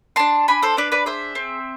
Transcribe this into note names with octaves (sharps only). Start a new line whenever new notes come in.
D4 A5 C6
D4 G#5 B5
A4 C5
D4 B4 D5
B4 D5
G#4 C5 E5
C4